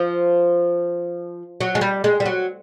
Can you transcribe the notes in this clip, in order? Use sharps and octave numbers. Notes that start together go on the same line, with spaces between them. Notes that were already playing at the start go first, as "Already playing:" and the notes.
Already playing: F3
F#3
G#3
G3
G#3
G3
F#3